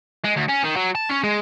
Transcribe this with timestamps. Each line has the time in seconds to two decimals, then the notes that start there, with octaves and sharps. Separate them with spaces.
0.24 G#3
0.36 D2
0.49 C#4
0.64 D#3
0.76 F#3
0.95 A5
1.09 C#4
1.24 G#3